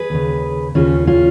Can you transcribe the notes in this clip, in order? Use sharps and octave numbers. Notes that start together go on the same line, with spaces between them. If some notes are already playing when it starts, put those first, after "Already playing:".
Already playing: G#4 B4
D#2 C#3
D#2 C#3 C#4 F4
C#4 F4